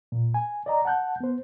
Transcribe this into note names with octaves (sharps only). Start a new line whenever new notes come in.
A#2
G#5
D5 D#5 A#5
F#5 A5 F#6 G6
B3 C5